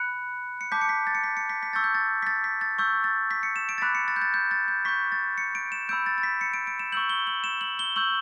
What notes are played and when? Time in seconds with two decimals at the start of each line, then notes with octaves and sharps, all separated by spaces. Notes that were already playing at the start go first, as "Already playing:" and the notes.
Already playing: B5 F#6 C#7
0.61 C#7
0.72 A5 D6 G6 B6
0.81 C#7
0.89 B6
1.07 A6
1.15 C#7
1.24 B6
1.37 C#7
1.50 B6
1.63 B6
1.73 C#6 E6 G6 A6
1.84 G6
1.95 A6
2.22 B6
2.27 A6
2.44 B6
2.61 A6
2.79 C#6 E6 G6
3.04 A6
3.31 B6
3.43 C#7
3.56 E7
3.69 D7
3.78 A6
3.82 B5 D6 F#6 B6
3.95 C#7
4.08 A6
4.16 G6
4.22 A6
4.34 G6
4.51 A6
4.68 G6
4.85 C#6 G6 B6
5.12 A6
5.38 C#7
5.55 D7
5.72 E7
5.89 B5 E6 G6 D7
6.06 A6
6.18 A6
6.23 B6
6.41 C#7
6.54 D7
6.67 D7
6.79 E7
6.92 C#6 E6 G6 F#7
7.09 G7
7.27 F#7
7.44 E7
7.61 F#7
7.79 G7
7.96 C#6 E6 G6 F#7